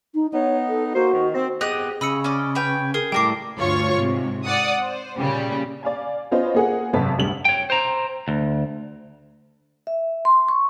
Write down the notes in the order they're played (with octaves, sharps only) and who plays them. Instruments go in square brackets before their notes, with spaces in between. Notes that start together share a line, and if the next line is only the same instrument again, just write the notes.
[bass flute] D#4
[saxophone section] B3 D#4 [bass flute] C#5
[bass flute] A4
[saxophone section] A#3 C5 [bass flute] F#4
[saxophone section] D#3
C4
[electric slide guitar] B3 G4 [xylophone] G#4 [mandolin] D#5 F#6
[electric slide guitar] C#3 [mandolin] D#5 [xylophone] B5 E6 C#7
[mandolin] C#4 D5 D#5
B4 C#5 G5
[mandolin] G#4 [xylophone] A#4
[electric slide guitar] A2 G3 [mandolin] A4 A#4 D6 [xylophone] G5 C7
[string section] D2 G2 F4 C#5 C#6
G#2 C3
D5 F#5 D#6
C5
A#2 C#3 G3
[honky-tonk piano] D5 F5 G#5
B3 C#4 F4 C5 D#5
A#3 G#4 F#5
G#1 F#2 C3 B4 A5 B6
F1 D2 G2 F#7
[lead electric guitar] C#5 G5
C5 A#5
D2
[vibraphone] E5
C6
C#6